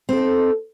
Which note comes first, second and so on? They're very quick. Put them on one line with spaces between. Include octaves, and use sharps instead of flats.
C4 A4 D#4